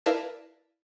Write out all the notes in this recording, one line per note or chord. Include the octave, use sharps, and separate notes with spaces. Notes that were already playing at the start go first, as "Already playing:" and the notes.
E4 A#4 B4 D5 F5 A5